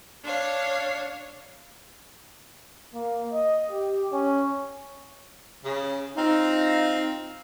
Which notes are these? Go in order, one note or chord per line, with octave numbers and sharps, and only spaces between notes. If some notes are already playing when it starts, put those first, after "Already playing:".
D4 C#5 F5
A#3
D#5
G4
C#4
C#3
C4 D#4 F4 F5